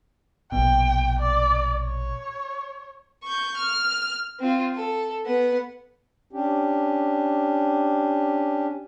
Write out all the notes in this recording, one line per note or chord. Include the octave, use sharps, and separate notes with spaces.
A#1 B2 G5
D5
C#5
C#6 G6
F6
C4 F4
A4
B3 F#5
C#4 D4 G4